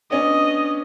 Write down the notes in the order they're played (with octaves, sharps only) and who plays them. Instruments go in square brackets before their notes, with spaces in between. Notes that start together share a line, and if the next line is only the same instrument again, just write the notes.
[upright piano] B3 C#4 D4 [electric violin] D#5